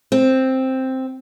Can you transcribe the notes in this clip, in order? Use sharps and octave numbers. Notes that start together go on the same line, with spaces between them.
C4